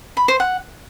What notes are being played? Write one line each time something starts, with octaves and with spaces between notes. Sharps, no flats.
B5
C5
F#5